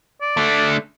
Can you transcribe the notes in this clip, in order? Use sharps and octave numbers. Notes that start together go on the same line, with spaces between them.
D5
D3 A3